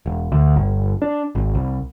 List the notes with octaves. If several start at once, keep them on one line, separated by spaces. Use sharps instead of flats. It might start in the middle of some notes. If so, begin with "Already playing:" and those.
E1
D2
G1
D4
G#1
C2